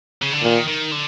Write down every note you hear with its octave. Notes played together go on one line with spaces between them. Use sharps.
C#3
D3
A#2 D#3
D#3
D3